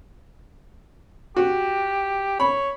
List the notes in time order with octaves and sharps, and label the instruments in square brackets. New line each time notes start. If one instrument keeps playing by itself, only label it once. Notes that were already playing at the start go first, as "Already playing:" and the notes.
[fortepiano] F#4 [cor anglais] G4
[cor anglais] C#5 [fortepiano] B5